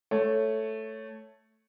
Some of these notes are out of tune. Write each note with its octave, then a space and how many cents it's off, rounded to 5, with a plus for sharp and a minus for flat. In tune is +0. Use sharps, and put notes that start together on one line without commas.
A3 +0 C#5 +0